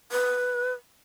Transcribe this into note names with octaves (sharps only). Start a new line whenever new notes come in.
B4